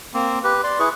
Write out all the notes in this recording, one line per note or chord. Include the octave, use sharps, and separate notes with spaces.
A#3 C4
G4 B4
D5 C6
E4 G#4 B4 C#6